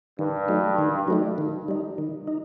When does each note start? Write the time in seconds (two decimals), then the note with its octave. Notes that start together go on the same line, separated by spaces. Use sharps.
0.19 G2 D#3
0.48 F#3 A3 D#4
0.78 D#3
1.08 F#3 A3 D#4
1.38 D#3
1.68 G3 D#4
1.98 D#3
2.28 D#4